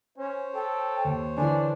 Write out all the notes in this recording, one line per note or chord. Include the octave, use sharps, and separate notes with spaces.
C#4 C5 C#5
A4 G5
D#2
D3 E3 D4 G#5